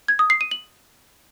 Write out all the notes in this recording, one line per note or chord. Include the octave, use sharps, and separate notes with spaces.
G#6
D#6
C7
D#7
F#7